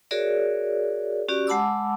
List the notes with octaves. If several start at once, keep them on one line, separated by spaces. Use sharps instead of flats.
F#4 G#4 A#4 C#5 D5 E5
C#4 F#4 G4 D5
G#3 F#5 A5 B5 D6 E6